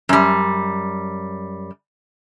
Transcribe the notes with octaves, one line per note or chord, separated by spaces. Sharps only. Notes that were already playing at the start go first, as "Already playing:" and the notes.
F#2 G3